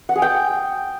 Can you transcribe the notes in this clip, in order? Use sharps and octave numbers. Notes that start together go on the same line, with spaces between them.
F#5
G#4
G5